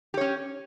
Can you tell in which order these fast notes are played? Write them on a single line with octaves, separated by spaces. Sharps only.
G4 C#5 C#4